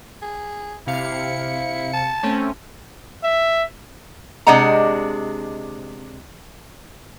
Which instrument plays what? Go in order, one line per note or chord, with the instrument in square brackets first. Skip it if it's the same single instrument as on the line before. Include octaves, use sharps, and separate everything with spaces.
[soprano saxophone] G#4
[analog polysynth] C3 F5 C#7 [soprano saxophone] E4
[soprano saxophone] A5
[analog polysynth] A3 C4 C#4
[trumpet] E5
[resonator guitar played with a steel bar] C3 G#3 D4 D#5 F#5 A#5